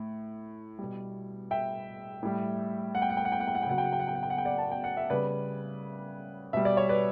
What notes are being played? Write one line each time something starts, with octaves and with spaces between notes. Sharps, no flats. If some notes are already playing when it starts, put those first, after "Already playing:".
Already playing: A2
B2 G3
E5 G5
A2 G3
F#5
G5
F#5
G5
F#5
G5
F#5
G5
F#5
G5
C#3 F#3 F#5
G5
F#5
G5
F#5
G5
F#5
G5
F#5
G5
D5 F#5
A5
G5
F#5
E5
C#3 G3 B4 D5
B2 G3 E5
D5
C#5
B4 D5